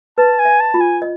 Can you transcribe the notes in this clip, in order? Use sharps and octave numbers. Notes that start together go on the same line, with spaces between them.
B4 A5
G#5
E5
A5
F4
G#5
D#5